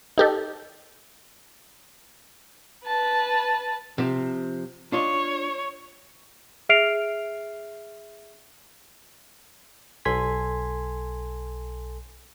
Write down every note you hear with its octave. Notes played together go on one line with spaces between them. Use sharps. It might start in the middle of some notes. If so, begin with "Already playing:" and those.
D#4 G4 A4
B4 A5
C3 F3 C4
D4 F4 C#5 D#5
G#4 E5 F6 C7 D7 F7
B1 A4 G#5 C6 G#6 B6